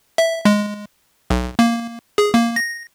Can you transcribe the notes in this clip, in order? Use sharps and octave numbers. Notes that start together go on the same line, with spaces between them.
E5
G#3
B1
A#3
G#4
A#3
A#6